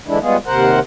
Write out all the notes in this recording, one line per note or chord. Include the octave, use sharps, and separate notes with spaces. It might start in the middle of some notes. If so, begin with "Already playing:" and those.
D3 E3 G#3 D4 E4
G3 G#3 B3 F4 G#4
D#2 C3 A#4 C5 F#5